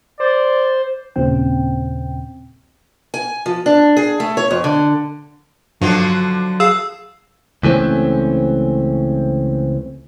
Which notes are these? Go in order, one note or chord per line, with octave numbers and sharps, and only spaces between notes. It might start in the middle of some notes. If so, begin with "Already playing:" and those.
C5 D5
D#2 A#2 C#3 C4 G5
G#5
F3
D4
G#4
A3
C#5
F2
D3
G2 D3 F3 F#3
G#4 F5 E6
C#2 E3 A3 C4 C#4